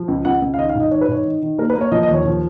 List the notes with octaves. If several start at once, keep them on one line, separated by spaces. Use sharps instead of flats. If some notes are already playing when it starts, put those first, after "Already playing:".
Already playing: F3
C#2
C#2 F#5
C#2
F5
D#3 D#5
F5
G#2
D#5
D#3 C#5
B4
G#2 C#5
D#3
D#3
A#3 A#4
B4
A#3
C#5
F3 D#5
D#5
D#2
C#5
F3